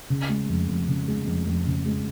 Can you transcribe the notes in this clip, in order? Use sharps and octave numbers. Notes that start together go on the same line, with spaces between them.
C#3
G#3
F2
F2
C#3
G#3
F2
F2
C#3
G#3